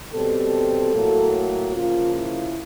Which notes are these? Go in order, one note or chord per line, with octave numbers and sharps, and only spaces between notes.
B2 G3 C4 A4
A2 F#3 A#3
C#3 F3 A#3 F4
E4